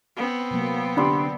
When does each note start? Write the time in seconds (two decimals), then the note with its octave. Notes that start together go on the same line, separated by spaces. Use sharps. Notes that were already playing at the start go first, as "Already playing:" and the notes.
0.17 B3 C4
0.51 C3 F#3 A#3
0.97 D3 D4 G4 D5 B5 C6